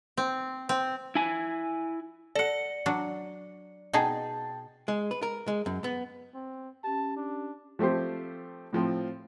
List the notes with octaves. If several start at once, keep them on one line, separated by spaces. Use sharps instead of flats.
C4
C4
E4 G#5
A4 D5 F#5 C#7
F#3 D4
B2 D#4 G#4 G5 A5
G#3
B4
A#4
G#3
F#2
B3
C4
C#4 G4 A5
D4
F3 A3 C4 G4 C5
A2 F3 C4